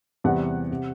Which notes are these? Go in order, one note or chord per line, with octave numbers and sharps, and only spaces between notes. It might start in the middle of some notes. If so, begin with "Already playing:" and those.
E2 C3 E3 G3 F#5
C3